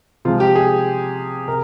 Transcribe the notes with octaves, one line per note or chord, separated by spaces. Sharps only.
C3 F3 G#3 F4
G4
G#4
C3 A#4